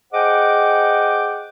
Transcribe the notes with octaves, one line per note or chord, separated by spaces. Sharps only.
G#4 C5 D#5 F#5 G5 D6